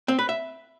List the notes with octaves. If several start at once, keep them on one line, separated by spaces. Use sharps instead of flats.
C4
B4
E5